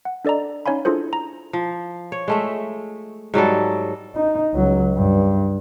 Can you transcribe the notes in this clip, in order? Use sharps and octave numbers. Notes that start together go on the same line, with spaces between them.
F#5
D4 A4 D5 D#5 A#5
C#4 D#4 C#5 F5 G#5 B5
D4 E4 F4 G#4 A4 C5
A#5
F3
C#5
G#3 A3 E5
G#2 F#3 G3 A4
D#4
C#2 F#3
G2